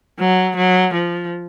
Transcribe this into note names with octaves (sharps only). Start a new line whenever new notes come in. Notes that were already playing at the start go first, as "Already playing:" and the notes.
F#3
F#3
F3